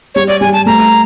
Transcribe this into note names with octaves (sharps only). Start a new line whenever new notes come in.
G3 C#5
D5
G3 G#5
A5
A3 A#5